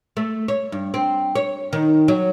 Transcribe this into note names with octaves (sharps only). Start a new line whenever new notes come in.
A3
C#5
G2
C4
C#5
D#3
F#3